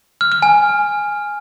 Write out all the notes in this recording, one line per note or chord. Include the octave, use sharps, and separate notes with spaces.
F6
F6
G#5